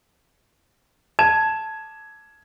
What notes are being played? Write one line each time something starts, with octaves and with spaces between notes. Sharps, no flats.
A5 G#6 E7